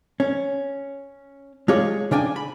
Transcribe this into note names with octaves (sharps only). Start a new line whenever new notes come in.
C#4
G#3 F4 G4 G#4 C#5
C#3 C#4 D4 G5 G#5
B5